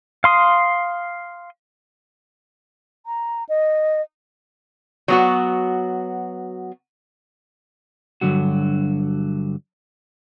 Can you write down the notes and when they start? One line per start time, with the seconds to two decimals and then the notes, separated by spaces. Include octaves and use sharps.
0.24 F5 C6 D#6
3.06 A#5
3.49 D#5
5.08 F#3 B3 F#4
8.21 G2 A#2 D3 F#3 F#4